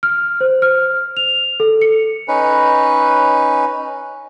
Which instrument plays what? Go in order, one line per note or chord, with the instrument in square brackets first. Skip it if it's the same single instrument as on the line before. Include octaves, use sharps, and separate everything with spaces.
[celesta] F6
C5
F6
F7
A4
C#7
[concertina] C#4 D#4 B4